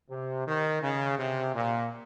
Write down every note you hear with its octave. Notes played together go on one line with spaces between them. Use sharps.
C3
D#3
C#3
C3
A#2